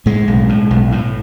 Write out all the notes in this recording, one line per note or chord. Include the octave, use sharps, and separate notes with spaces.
A2 G#3
B1
A2
B1
A2